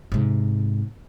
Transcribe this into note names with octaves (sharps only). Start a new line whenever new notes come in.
G#2 C3